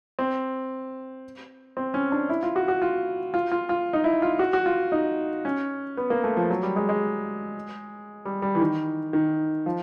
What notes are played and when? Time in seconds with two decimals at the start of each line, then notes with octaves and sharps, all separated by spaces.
0.19 C4
1.77 C4
1.94 C#4
2.12 D4
2.29 E4
2.43 F4
2.56 F#4
2.68 F#4
2.82 F4
3.34 F4
3.52 F4
3.69 F4
3.93 D#4
4.04 E4
4.22 F4
4.39 F#4
4.53 F#4
4.66 F4
4.92 D#4
5.45 C#4
5.97 B3
6.10 A#3
6.24 A3
6.37 F3
6.50 F#3
6.63 G3
6.76 G#3
6.89 G#3
8.25 G3
8.42 G3
8.55 E3
8.60 D#3
9.13 D#3
9.66 F3